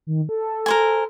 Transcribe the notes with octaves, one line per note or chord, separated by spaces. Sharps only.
D#3
A4
A#4 C5 G#5